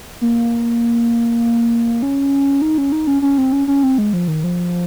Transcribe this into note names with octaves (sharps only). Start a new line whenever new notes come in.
A#3
C#4
D#4
C#4
D#4
C#4
C#4
C4
C#4
C#4
C4
G#3
F3
D#3
F3